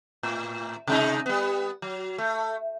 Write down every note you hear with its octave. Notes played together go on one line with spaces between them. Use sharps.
A2
C3 G#3 D#4
G3 B3
F#3
A3